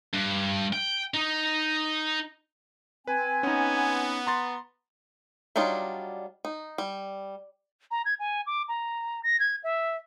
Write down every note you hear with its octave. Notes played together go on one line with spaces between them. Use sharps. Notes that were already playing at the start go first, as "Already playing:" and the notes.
G2
G5
D#4
C4 B4 G#5
B3 C#4 D#4
A#5 C6 A6
F#3 G3 D4 D#4 F4
D#4
G3
A#5
G#6
G#5
D6
A#5
A#6
G#6
E5